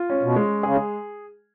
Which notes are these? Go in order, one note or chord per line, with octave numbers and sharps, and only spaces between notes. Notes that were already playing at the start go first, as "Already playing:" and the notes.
Already playing: F4
C#4
B2
G#3
C#3 G#4